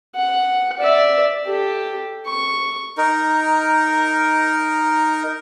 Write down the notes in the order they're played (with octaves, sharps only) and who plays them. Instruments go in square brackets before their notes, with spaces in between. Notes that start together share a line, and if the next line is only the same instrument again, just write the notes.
[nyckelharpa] F#5
D5 E5
G4 A4
C#6
[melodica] D#4 A#4